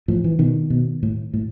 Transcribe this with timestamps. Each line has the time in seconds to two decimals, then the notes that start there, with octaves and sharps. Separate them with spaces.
0.08 A2 F3
0.24 E3
0.39 B2 D#3
0.70 B2
1.03 A2
1.34 A2